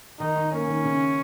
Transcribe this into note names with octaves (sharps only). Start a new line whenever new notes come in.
D#3 D#4
D#3
A#3 C#4
D#3
C#3